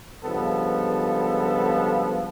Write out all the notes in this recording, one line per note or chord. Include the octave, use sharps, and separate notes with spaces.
C#2 G2 F3 B3 A4